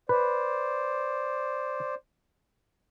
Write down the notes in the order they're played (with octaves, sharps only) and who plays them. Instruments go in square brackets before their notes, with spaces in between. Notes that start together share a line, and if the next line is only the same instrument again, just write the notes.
[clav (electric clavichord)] B4 [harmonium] C5 D5